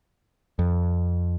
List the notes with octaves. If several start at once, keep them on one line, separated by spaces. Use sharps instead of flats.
F2